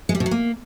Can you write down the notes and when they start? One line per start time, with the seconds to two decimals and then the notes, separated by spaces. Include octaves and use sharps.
0.09 G#3
0.15 G3
0.20 B2
0.26 F#3
0.31 A#3